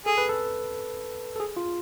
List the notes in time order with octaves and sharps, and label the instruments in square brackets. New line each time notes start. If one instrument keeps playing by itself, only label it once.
[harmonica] G#4 [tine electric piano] A4
[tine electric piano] B4
A4
A4
G#4
F4